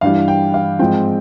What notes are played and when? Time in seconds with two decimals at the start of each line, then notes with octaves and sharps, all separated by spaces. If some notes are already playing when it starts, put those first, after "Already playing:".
0.01 G2 E3 G3 F5
0.28 G5
0.54 F5
0.79 G#2 F3 G#3 C4 G5